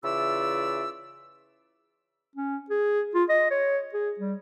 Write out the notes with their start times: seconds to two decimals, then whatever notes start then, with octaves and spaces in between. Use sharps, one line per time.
0.04 C#3 E3 F4 D5 E5 E6
2.36 C#4
2.70 G#4
3.14 F4
3.29 D#5
3.50 C#5
3.93 G#4
4.19 G3